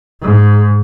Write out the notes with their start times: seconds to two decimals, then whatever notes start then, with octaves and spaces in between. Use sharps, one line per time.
0.21 G#2